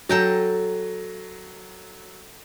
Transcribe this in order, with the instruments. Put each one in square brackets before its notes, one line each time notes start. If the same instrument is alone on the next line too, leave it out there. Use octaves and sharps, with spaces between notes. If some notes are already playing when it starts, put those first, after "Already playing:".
[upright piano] F#3 [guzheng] A4 G5 A#5